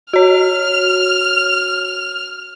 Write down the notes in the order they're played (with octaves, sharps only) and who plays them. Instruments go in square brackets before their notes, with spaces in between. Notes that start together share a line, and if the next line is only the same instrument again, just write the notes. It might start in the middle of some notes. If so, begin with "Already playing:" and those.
[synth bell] F#4 C#5 [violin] F6